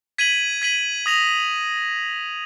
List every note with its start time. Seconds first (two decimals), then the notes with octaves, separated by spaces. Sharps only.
0.18 G#6 B6 D#7 F#7
0.62 G#6 B6 D#7 F#7
1.06 D#6 A#6 F7